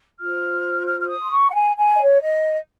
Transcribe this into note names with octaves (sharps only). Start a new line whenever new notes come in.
F4 C5 F6
F6
F6
D#6
C6
C#6
F#5
G#5
G#5
D#5
C#5
D#5